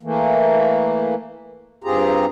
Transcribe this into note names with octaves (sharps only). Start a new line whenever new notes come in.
E3 A3 A#3
G2 C4 F4 G4 G#4 A#5